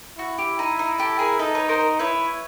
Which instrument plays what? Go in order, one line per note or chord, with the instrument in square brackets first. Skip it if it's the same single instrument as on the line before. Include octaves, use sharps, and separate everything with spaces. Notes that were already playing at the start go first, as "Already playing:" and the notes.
[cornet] E4 [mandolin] F#4
[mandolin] G4
D#4
D#4
G4 A4
G#4 A#4
[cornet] D#4 [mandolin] A4 B4
[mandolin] B4 C#5
A#4 C5
[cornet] E4 [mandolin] B4 C#5